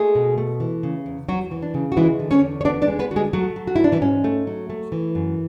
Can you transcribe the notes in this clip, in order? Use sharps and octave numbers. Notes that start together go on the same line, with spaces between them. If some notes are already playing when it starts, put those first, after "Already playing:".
Already playing: G#3 A3 G#4
B2
A3
E3
C#3
E2
E2 F#3 F#4
E3
D4
C#3
F#4
E3 G#3 E4
D3
C#4 C#5
E2
C#5
B3 D4 D5
D4 D5
G#3
B3 B4
D3 F#4
G#3 G#4
F#3 A3 F#4
F#3
F#4
G#2 E4
D4
E3 E4
G#2 C#4
A3
F#3
A3
E3
F#2